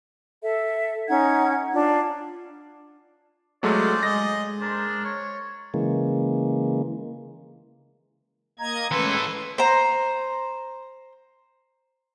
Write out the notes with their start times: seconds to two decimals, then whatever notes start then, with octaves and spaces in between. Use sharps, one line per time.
0.42 A4 E5
1.09 C#4 D#4 F#5 G#6
1.73 D4 F4
3.63 F#3 G#3 A3 C#4 F4 C5 D5
4.03 G#3 G#4 D#5 A#6
4.60 D4 A#4 C5
5.05 C#5
5.74 C#3 E3 G#3 A#3
8.59 A#3 D#5 A#5 G#6
8.92 E3 G#3 A3 C#4 A4 B4 C6
9.58 C5 A#5